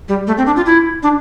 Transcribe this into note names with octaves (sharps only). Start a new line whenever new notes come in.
G3
A3
C4
D4
F4
E4
D4